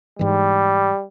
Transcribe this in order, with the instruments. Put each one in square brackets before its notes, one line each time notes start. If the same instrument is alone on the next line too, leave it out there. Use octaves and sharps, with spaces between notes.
[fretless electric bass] G#2 E3 [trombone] G3